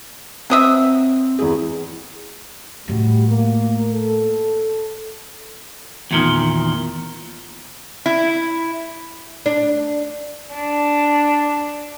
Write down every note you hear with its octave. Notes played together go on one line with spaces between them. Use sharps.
F#3 C4 D#5 E5
E2 E4 G#4
A2 G3 A3 F#4 G4
A#3
A4
E2 A#2 D#3
E4
D4
D4